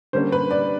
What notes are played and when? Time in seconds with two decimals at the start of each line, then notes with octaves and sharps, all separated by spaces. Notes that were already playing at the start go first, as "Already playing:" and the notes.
0.13 D3 G3 A#3 C#4 C5
0.32 B4
0.51 D5